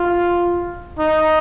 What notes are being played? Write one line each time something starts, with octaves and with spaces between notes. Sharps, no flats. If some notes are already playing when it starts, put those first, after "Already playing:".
Already playing: F4
D#4